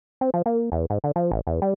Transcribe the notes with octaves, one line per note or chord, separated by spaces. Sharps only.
C4
F3
A#3
E2
G#2
D3
F3
A1
E2
G3